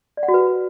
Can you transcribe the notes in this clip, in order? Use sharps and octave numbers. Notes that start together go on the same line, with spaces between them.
D5
F#5
F#4
B4